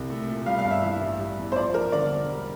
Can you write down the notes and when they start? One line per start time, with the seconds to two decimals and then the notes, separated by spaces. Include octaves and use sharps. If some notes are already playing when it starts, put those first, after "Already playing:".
Already playing: C2
0.10 A3
0.28 A#2
0.46 G3 F5
0.58 F5
0.65 G2
0.71 E5
0.82 E3
1.01 A1
1.19 G3
1.37 E2
1.52 C5
1.56 F3 D5
1.74 A#1 A#4
1.92 D3 D5
2.11 E1
2.29 G3